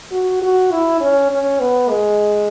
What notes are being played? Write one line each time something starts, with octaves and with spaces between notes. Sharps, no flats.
F#4
F#4
E4
C#4
C#4
B3
G#3